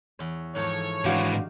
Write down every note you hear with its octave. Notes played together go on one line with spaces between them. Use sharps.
E2 C#5
G#2 E3 F3 A4 C#5
G#2 D#3 E3 D4 F#4 F5